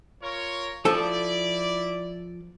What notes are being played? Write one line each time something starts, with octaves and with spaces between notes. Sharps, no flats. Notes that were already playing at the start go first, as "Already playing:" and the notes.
F4 A#4 C#5
F3 E4 A4 D5